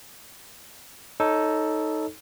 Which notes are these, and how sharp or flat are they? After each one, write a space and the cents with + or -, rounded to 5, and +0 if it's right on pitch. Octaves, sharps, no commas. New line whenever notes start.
D#4 +10 A4 +0 C#5 +0